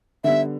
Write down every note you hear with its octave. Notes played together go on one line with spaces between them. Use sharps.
D3 G3 B3 E5